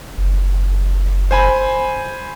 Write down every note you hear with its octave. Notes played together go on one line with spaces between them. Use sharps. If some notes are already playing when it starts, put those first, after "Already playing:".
F#1
C5 G#5 B5